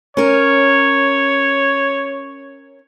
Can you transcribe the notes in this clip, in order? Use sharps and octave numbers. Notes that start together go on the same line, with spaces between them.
C#4 A#4 C#5